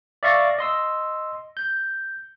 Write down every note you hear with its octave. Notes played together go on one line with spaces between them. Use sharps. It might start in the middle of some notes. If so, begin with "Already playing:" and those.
D5 E5 F5 C#6 A6 A#6
D#5 C6 E6
G6